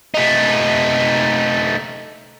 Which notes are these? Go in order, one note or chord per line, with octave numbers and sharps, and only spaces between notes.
A3 D#4